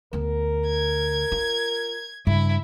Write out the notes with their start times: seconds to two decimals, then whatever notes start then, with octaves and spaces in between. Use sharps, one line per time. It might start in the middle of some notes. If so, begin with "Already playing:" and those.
0.13 D2 B3 A#4
0.67 G#6
1.32 F4
2.27 G2 C#3 E4